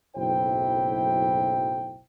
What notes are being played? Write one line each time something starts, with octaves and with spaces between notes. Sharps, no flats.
F#1 B1 A2 E4 C5 G5